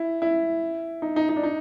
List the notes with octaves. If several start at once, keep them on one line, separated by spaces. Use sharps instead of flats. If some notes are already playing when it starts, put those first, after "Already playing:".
Already playing: E4
E4
D#4
D#4
D#4
D4
D#4